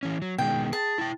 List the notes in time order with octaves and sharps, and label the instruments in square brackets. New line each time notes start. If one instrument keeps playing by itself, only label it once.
[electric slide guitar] E3 C#4
F#3
[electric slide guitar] B2 D#3 G#3 [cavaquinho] G5
[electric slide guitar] G#4 [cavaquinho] A5
[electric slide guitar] E4 G5